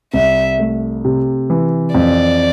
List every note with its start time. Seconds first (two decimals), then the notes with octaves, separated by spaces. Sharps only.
0.14 C2 E5
0.59 A3
1.05 C3
1.50 E3
1.95 F2 D5